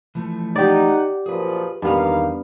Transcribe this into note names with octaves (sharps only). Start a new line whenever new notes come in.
E3 F3 A3
D#4 G4 D5 F#5
F#2 A#2 F3 G#4 B4
E2 G2 D#3 A#3 B3 D#4 F5 A#5